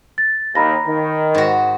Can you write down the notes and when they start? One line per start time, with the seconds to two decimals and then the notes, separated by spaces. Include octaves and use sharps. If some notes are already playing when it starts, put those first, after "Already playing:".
0.18 A6
0.55 D#2 A#5 B5 A#6
0.87 D#3
1.35 G#2 F#4